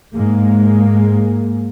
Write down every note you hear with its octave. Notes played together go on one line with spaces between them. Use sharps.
G#2 G#3 A#3